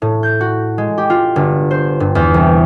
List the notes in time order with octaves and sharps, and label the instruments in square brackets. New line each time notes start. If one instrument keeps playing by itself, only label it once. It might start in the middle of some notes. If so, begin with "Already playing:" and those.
[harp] A2
G6
F#4
G#3
G4
F4
G1
C5
G2
E2
C2